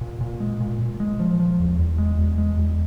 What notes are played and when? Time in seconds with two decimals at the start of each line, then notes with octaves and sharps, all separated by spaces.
0.01 A#2
0.21 A#2
0.40 G#3
0.60 A#2
0.81 A#2
1.00 G#3
1.20 F3
1.40 F3
1.59 E2
1.79 E2
1.98 G#3
2.19 E2
2.38 G#3
2.58 E2